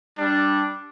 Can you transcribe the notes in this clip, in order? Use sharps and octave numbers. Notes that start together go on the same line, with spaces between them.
G3 D4